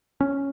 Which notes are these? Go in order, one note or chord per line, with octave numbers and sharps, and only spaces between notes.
C#4